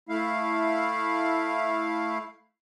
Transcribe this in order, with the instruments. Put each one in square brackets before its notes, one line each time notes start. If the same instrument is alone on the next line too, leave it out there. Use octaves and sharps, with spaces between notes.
[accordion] A3 E4 F5